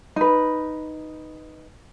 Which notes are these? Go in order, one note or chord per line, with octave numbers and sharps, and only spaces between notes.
D#4 B4